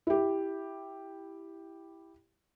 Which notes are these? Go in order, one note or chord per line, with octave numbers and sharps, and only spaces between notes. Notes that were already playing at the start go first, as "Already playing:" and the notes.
E4 G4